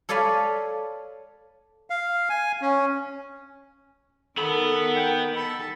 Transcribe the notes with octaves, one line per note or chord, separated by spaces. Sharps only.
A4 C#5 D5 F5 G#5 B5
F5
G#5
C#4
D#3 B3 A4 B5
G5
A4 B5